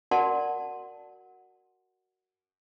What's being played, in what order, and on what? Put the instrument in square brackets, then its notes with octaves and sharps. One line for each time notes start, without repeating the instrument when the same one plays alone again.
[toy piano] F#4 A#4 D5 F#5 A5 C6